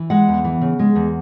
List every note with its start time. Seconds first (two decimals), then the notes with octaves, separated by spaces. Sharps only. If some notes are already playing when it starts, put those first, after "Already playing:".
Already playing: E3
0.10 G#3 F#5
0.28 E2
0.44 E3
0.61 C#3
0.79 G#3
0.95 E2